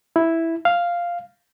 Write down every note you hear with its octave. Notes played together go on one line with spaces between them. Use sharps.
E4
F5